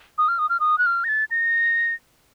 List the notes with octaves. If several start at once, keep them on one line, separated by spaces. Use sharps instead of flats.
D#6
F6
D#6
F6
D#6
F#6
F6
A#6
A6
A#6